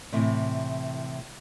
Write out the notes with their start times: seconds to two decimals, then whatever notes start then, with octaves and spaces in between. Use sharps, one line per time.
0.12 A2 C3 E3